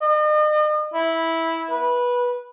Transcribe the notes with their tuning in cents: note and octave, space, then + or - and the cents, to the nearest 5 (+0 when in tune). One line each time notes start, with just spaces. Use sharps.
D#5 -40
E4 -10
B4 -15